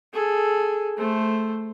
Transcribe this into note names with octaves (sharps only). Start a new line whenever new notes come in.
G#4 A4
A3 C5